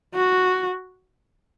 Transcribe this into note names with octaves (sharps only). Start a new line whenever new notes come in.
F#4